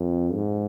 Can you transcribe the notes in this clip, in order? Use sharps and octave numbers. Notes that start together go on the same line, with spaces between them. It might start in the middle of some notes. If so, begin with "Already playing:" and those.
Already playing: F2
G#2